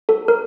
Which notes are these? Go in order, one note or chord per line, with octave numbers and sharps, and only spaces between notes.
A4
A#4